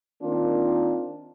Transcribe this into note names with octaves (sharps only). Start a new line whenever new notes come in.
D#3 A#3 C4 D4 F4